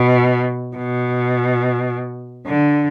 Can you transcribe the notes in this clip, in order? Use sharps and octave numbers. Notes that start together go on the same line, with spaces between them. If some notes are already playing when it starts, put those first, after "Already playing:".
Already playing: B2
B2
D3